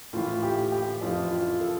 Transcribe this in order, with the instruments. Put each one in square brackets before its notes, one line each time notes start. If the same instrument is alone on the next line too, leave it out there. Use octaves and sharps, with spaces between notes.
[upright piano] A2 E3 F4
G4
G4
F2 E3 F4
F4
A4